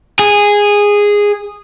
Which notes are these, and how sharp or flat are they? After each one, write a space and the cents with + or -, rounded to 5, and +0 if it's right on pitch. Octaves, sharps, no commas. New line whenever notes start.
G#4 -10